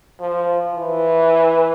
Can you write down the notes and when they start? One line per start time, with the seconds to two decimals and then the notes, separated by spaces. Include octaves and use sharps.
0.21 F3
0.74 E3